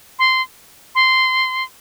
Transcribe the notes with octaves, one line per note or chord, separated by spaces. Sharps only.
C6
C6